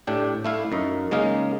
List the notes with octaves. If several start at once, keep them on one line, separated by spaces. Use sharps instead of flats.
A2 D4 G4
A3 E4 F5
F#2 D#4
C#3 G#3 A#3 D#4 F5